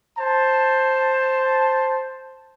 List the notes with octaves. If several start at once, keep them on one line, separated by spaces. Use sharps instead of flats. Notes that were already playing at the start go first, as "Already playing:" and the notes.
C5 A5